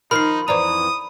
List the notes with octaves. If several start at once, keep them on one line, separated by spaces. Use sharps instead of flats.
D#3 F3 D#4 A#4 B5 F6 C7
F2 E3 C5 D5 A#5 D#6